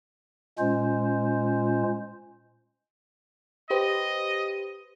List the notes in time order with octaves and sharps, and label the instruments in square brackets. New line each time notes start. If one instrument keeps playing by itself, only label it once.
[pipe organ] A#2 G#3 C#4 F4 C5
[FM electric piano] G4 B4 C5 [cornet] D#5